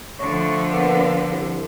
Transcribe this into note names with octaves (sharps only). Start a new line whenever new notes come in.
D3 F3 A3 C#6
A#3 B3
C2